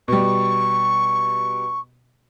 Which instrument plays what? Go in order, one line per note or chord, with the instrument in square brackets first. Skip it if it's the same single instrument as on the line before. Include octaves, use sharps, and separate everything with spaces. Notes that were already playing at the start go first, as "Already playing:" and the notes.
[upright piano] B2 G3 [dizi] C#6